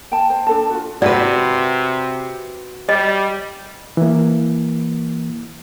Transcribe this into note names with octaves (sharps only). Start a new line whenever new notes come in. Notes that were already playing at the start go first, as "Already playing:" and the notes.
G5 A5
C5
D4 A4 A5
F4 F#4
C3 F#4 B4 D5
G3 D#5
E3 A#3